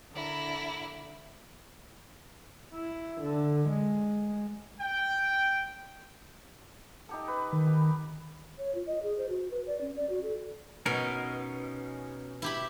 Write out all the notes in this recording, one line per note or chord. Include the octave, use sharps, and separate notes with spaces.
D3 E4 A#4
E4
D3
G#3
G5
D#4 G4 A4
B4
D#3
G4
C#5
F4
D#5
G#4
C5
F#4
B4
D5
C#4
D5
F#4
A4
B2 C#4 D#4 A#4
E4 G4 B5